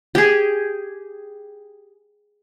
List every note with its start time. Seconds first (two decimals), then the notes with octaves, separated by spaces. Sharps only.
0.15 G4 G#4